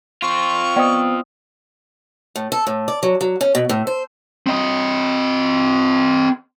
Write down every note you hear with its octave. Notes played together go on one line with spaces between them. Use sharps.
C4 F4 C#6
B3 C5 D5 D#5 G5 D#6
A2
A4
A2
D5
F#3
F#3
C#4
B2
A2
C5
C4 D#5